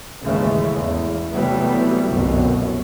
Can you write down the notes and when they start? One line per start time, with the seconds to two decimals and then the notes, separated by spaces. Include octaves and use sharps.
0.22 D#2 G#2 C#3 E3 G#3 A3
0.72 E2
1.32 C3 E3 F#3 G3 A3 B3
2.08 G1 C2 F#2 B2